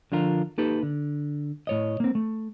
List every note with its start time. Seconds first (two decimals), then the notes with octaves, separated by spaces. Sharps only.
0.12 D3 F3 D4 F4 A#4
0.58 A#3 D#4 G4 A4 B4
0.83 D3
1.67 A2 C#5 D#5
2.00 A#3 C4
2.15 A3